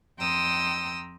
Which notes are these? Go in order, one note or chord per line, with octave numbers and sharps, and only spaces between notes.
F2 G5 A#5 C6 D#6 E6